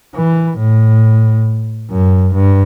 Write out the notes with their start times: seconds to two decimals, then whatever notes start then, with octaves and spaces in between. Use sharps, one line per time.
0.15 E3
0.58 A2
1.90 F#2
2.34 G2